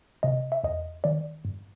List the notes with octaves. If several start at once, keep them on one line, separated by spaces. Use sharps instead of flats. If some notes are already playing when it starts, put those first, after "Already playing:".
C3 D#5
E5
E2 D#5
D#3 D5
G2